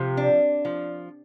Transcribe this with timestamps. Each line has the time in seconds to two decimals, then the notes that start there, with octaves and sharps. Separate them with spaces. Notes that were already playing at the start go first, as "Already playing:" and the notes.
Already playing: C3 F3
0.17 D4
0.65 F3